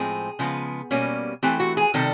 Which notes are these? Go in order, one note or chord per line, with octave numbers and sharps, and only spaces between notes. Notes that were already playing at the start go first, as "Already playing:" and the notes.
Already playing: A2 F3 G#3 C4 G#4
C#3 F3 G#3 B3
B2 G3 A#3 C#4
E3 A3 C4 G4
F#4
G#4
C3 D#3 G3 A4